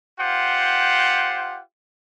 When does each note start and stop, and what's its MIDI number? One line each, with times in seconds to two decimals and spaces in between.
0.20 1.60 65
0.20 1.60 67
0.20 1.60 72
0.20 1.60 78